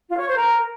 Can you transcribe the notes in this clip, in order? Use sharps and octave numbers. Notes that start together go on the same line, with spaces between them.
F4
C#5
C5
A#4